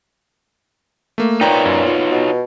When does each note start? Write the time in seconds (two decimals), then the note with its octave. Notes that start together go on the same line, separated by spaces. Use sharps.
1.18 A3 A#3
1.41 A#2 D#4 B4 C#5 G5 A#5
1.66 F#2
1.87 F4
2.11 B2